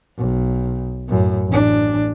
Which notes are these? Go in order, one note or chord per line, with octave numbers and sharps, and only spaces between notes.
B1
F#2 A2
A1 D4